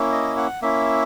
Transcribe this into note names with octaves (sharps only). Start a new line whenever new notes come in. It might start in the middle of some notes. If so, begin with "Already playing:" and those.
Already playing: A#3 C#4 E4
D#5
F#5
A#3 C#4 E4 E5